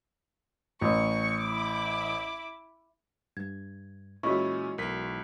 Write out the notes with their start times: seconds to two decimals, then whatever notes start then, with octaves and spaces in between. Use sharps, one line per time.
0.81 A1 C#6
1.41 E4 D6
3.37 G2 G#6
4.23 A#2 E3 G#3 C#4 E4 F#4 D#5 C#6
4.78 B1 A#4 B6